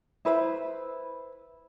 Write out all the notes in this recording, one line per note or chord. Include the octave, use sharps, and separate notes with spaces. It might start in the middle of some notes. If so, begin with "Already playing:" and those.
E4 B4 C5 B5